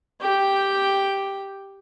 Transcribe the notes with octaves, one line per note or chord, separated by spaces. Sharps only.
G4 G5